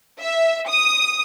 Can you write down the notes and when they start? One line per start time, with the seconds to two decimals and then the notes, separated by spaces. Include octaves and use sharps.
0.19 E5
0.68 D#6